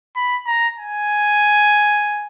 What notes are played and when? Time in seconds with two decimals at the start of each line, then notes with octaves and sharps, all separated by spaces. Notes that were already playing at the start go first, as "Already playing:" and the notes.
0.16 B5
0.47 A#5
0.78 G#5